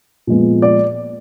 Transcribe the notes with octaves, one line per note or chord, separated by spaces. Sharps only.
A#2 F3 G#3 B3
D5